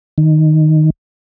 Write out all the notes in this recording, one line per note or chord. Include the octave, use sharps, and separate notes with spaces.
D#3